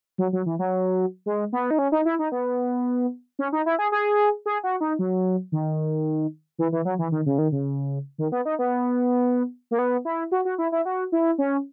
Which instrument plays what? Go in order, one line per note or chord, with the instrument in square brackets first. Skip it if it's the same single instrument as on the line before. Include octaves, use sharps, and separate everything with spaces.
[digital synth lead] F#3
F#3
E3
F#3
G#3
B3
D#4
C#4
D#4
E4
D#4
B3
C#4
D#4
E4
G#4
G#4
G#4
F#4
D#4
F#3
D#3
E3
E3
F#3
E3
D#3
C#3
D#3
C#3
D#3
B3
D#4
B3
A#3
B3
E4
F#4
F#4
E4
E4
F#4
E4
C#4